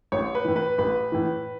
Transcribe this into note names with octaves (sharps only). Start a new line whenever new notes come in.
A1 C#5
B4
A2 E3
B4
A1 B4
A2 E3